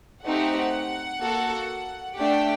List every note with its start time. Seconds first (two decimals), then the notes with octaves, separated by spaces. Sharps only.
0.23 A3 C4 D#4 G4 F#5
1.19 A#3 F#4 A4
2.15 A3 D4 G4 G5